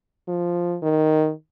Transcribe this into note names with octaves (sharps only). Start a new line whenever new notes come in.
F3
D#3